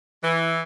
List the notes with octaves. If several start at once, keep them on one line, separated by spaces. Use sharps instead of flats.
E3